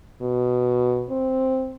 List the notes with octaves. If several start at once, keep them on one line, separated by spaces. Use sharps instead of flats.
B2
C4